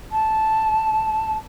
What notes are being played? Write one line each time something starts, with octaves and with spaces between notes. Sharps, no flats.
A5